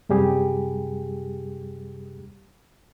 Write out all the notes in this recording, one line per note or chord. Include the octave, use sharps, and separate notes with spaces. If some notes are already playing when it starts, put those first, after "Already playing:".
F#2 C3 G3 G4 G#4